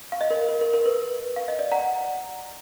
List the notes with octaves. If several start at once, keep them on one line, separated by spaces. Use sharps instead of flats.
F5
D#5
A#4
A#4
A#4
A#4
B4
F5
D#5
D5
F#5 A#5